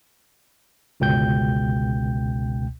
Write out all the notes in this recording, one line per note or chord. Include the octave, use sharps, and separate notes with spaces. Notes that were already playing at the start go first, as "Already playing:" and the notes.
G1 C#2 B2 G5 G6